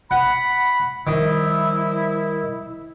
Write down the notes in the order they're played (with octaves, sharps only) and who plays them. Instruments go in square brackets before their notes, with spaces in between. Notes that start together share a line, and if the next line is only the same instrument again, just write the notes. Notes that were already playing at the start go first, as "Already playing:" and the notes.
[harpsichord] F#5 [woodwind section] B5
[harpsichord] D#3 [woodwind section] F3 G3 E4